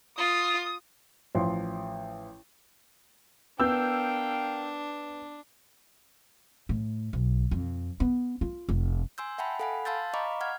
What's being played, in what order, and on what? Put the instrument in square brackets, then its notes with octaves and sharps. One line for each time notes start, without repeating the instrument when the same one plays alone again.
[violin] F4 [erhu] D#6
[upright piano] A1 F3 C6
[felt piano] B3 [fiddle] D4 [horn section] A#4 F5 G5 [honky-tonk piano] E6 G6
[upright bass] A2
B1
F2
B3
F4
F1
[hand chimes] G#5 C6 E6 G6
E5 F#5 G5 A5 B5
A4 F5 F#5 G#5 B5
F5 A5 C6 E6 G6 A6
D#5 F5 A#5 B5 C#6 D6
F#5 F6 G#6